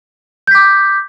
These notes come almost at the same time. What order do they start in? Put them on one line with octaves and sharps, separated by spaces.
G6 B6 D6